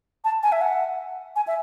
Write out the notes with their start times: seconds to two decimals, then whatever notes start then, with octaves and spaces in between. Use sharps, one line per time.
0.25 A5
0.43 G#5
0.52 E5
0.61 F#5
1.36 G#5
1.47 E5